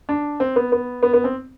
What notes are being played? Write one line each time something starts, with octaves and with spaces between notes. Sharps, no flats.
D4
C4
B3
B3
B3
B3
C4